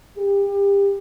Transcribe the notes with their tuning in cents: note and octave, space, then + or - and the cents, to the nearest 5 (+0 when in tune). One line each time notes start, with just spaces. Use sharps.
G4 +30